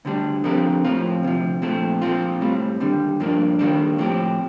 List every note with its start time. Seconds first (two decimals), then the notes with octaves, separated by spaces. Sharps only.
0.05 D2 D3 G3 D4
0.44 D3 F3 C4 G4 A#4
0.84 A2 F3 C4 F4
1.23 D2 C3 F3
1.62 A#2 F3 A3 C4
2.02 A#2 F3 C4 F4
2.41 A2 G3 C4
2.80 D#2 D3 G3
3.20 G2 F3 A#3 D4
3.59 D#2 D#3 G3 A#3 D4
3.98 A2 F3 C4 G4